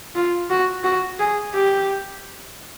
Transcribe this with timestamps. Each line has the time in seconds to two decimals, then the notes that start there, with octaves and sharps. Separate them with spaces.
0.15 F4
0.50 F#4
0.84 F#4
1.19 G#4
1.54 G4